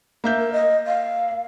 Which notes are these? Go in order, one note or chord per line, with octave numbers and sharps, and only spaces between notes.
A#3 E5 G6
A#4
D#5
F5